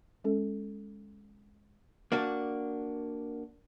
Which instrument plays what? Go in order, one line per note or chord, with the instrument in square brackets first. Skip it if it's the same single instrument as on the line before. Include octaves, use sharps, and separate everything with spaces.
[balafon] G#3 C#4 A4
[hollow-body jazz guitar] A#3 D4 F#4